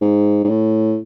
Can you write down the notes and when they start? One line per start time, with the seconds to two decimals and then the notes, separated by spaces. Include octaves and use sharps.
0.02 G#2
0.45 G#2
0.49 A2